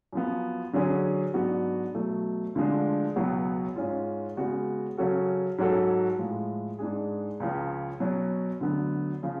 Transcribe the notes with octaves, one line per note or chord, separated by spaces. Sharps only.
F#2 F3 B3
D3 F#3 C#4 G#4
G#2 F#3 B3 D4 F#4
B2 F#3 A3
D2 D3 F3 G#3 D4
C#2 B2 F#3 B3 F#4
G#2 G#3 C#4 F4
C#3 G#3 B3 F#4
C#3 F#3 C#4 F#4 A4
G#2 F#3 C#4 F#4 A4
A2 F3 G#3
G#2 G#3 D4 G#4
C#2 C#3 F3
B2 F#3 C#4
D2 D3 F#3 B3
C#3 F3